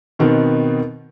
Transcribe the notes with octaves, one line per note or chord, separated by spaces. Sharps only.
B2 D#3 B3 C4